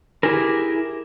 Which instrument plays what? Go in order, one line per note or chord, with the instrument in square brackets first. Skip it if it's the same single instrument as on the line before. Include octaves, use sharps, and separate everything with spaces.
[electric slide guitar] E4 G4 G#4 A#4